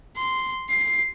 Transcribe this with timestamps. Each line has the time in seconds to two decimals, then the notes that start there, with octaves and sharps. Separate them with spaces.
0.17 C6
0.70 C7